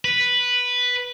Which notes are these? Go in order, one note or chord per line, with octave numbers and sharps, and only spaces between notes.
B4